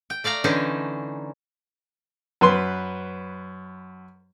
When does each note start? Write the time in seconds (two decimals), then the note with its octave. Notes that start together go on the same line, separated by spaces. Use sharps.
0.10 G5
0.24 A3 D5 F5 A#5
0.44 D3 E3 C#4 D#4 C5
2.41 F#2 B4 C6